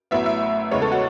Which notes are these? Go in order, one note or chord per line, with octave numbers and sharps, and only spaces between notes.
A1 A2 F#3 B3 E5
E5
E2 C#3 G#3 B3 C#5
A4
F#4